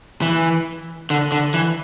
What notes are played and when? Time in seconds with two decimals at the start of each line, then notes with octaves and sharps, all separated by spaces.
0.22 E3
1.10 D3
1.32 D3
1.54 E3